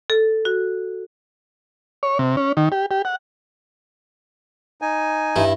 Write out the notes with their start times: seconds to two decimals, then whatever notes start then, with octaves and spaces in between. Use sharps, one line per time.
0.10 A4
0.45 F#4
2.03 C#5
2.19 C3
2.37 C#4
2.57 D#3
2.72 G4
2.91 G4
3.05 F#5
4.82 D#4 G#5
5.36 G2 E4